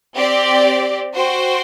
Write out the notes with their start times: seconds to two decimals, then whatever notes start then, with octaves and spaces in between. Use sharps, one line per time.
0.16 C4 G4 D5
1.15 F#4 C5 G5